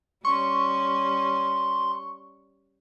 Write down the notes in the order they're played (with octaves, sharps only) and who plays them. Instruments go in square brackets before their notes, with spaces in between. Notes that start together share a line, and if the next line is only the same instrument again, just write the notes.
[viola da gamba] G3 C#4 [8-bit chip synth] C6 [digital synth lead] C#6